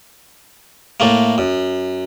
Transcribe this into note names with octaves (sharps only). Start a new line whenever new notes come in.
A2 A3 A#3
F#2